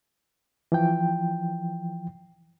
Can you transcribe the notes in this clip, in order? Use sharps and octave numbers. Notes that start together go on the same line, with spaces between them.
E3 F3 G5